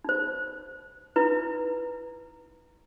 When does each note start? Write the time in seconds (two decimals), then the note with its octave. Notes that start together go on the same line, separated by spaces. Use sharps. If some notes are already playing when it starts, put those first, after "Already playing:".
0.04 D#4 C5
1.16 D#4 E4 B4